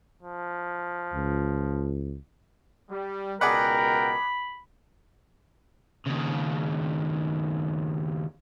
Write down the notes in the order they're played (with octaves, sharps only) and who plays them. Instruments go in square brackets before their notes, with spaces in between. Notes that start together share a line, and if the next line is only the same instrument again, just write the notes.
[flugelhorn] F3
[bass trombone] C#2
[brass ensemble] G3
[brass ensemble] C#2 B2 G5 [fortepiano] G#4 D5 F#5 [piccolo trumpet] A#4 [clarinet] B5
[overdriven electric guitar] D#2 C#3